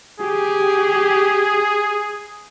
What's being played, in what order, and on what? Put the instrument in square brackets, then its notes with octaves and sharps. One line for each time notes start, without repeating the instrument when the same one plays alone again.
[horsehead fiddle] G4 [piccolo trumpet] G#4